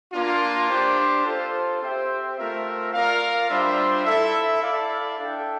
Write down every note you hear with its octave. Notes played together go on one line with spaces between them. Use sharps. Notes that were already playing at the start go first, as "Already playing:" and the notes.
A#3 D4 F4
D4 G4 C5
F4 A4 C5
C4 G4 C5 E5 G5
A3 C4 F4 A#4 E5
F4 A#4 D5 F5
G3 D4 F4 C5 E5
E4 A4 E5
E4 A4 D5 F5
D4 A4 E5 G5